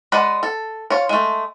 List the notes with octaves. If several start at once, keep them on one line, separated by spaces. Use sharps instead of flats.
G#3 B4 D5 F#5
A4
F4 C#5
G#3 A3